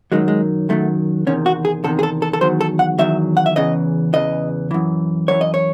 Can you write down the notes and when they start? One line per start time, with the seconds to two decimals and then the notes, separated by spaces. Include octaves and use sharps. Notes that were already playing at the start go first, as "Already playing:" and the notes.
0.12 F#2 D#3 F#3 G#3
0.28 G#3
0.69 F#2 D#3 F#3 A3
1.27 E2 C3 D#3 C#4
1.46 F#4
1.65 G#4
1.84 E2 C3 D#3 A4
1.99 G#4
2.03 A4
2.22 A4
2.33 A4
2.41 E2 D#3 F#3 C5
2.61 A4
2.79 F#5
2.98 E2 D#3 F#3 E5
3.37 F#5
3.46 E5
3.56 E2 C#3 E3 D#5
4.13 E2 C#3 E3 D#5
4.71 F#2 E3
5.28 F#2 E3 C#5
5.41 D#5
5.54 C#5